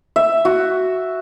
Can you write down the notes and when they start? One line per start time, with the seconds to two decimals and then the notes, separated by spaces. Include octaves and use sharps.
0.16 E5
0.45 F#4